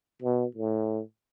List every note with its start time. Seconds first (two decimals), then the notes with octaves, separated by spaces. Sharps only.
0.22 B2
0.55 A2